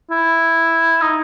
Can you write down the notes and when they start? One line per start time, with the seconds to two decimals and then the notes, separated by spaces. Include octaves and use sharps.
0.11 E4
1.01 D#4